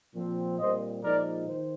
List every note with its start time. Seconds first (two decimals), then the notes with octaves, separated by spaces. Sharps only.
0.14 A#2 F3 C4
0.58 A#2 G3 C4 C5 D#5
1.03 A#2 F3 G#3 D#4 A#4 D5
1.46 D#3 C5